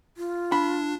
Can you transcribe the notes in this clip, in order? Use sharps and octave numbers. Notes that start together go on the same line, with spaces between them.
F4
D4 B5